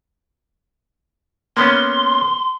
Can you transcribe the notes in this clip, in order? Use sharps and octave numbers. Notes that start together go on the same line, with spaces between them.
A#3 B3 C#4 C6